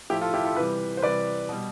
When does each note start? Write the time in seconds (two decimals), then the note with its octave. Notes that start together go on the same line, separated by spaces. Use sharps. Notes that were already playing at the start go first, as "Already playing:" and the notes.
0.10 A2 F3 E4 G4
0.21 F4 A4
0.34 E4 G4
0.45 F4 A4
0.56 C3 E3 G3 G4 B4
0.97 C5
1.02 C3 E3 G3 B4 D5
1.49 B2 G3